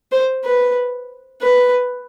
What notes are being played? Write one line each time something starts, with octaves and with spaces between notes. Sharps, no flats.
C5
B4
B4